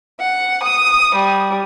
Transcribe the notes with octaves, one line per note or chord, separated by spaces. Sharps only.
F#5
D#6
G3